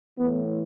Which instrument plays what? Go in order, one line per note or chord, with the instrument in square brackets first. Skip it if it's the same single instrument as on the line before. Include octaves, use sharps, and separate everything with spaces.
[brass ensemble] A2 E3 B3